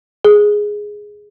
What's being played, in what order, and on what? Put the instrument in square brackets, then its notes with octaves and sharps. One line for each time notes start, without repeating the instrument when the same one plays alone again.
[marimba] G#4